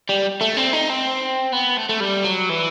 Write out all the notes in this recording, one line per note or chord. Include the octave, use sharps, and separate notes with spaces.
G3
A3
C4
D#4
C4
B3
A3
A3
G3
F#3
E3